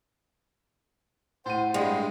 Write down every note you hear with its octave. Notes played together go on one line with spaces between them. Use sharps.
A2 C5 F#5 D#7
G2 G#3